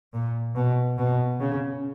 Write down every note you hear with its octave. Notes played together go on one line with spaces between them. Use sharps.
A#2
B2
B2
C#3